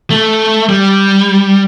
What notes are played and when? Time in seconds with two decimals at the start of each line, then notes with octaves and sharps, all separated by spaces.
0.10 A3
0.69 G3